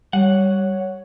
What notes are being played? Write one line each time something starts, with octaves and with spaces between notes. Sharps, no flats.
G3 C#5 F#5